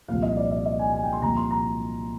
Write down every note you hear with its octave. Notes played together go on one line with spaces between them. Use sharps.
C2 A#2 F3 F5
D#5
D5
D#5
D#5
G#5
G#5
G5
C6
C2 A#2 F3 A#5
C6
A#5